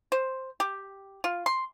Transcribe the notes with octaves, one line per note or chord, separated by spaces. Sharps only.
C5
G4
F4
C6